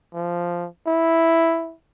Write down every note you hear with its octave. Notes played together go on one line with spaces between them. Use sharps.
F3
E4